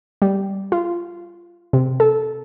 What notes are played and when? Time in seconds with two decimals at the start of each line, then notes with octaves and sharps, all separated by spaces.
0.22 G3
0.72 F4
1.73 C3
2.00 A4